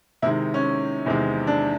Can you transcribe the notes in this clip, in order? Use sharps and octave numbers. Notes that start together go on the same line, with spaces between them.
C3 D#3 G#3 E4
C#4
E2 C3 D#3 G#3
D4